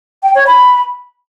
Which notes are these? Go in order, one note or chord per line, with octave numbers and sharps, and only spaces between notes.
G5
C#5
B5